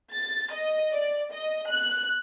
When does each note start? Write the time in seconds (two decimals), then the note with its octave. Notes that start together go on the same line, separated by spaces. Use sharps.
0.12 A6
0.53 D#5
0.92 D5
1.32 D#5
1.69 F#6